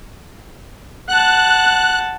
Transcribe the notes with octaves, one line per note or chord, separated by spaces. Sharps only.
F#5 A5 F#6